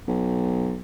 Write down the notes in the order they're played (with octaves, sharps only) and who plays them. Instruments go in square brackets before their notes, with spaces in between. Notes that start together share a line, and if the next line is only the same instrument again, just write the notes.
[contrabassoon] B1